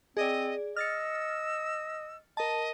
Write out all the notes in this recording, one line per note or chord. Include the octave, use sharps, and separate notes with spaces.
C4 G#4 D5 D#5
D#5 E6 F6 A6 C#7
A#4 D#5 A5